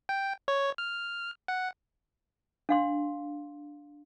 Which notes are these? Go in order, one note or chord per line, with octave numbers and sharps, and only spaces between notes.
G5
C#5
F6
F#5
D4 F5 C6